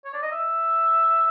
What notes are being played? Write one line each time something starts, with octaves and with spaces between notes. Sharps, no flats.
C#5
D5
D#5
E5